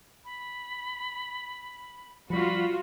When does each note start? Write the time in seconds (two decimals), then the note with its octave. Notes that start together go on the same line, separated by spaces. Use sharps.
0.25 B5
2.30 F3 G3 F4 F#4 B5